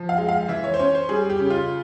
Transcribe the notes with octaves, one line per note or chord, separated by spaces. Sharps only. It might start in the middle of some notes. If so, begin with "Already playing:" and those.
Already playing: F3
F5
G#3
F5
E3 E5
C#5
C5
C#4 C#5
C5
G3 G#4
G4
C#3
F4